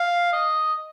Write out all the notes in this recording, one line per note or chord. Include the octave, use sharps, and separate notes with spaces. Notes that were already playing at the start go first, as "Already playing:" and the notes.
Already playing: F5
D#5